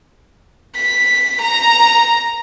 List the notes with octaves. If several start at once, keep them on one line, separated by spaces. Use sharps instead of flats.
B6
A#5